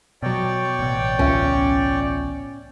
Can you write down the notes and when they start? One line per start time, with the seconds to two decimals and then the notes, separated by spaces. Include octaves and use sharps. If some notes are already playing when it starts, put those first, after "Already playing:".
0.22 B2 F#3 C#5 D5 G5
0.79 A1 B2
1.19 C#2 C#4 F4 E5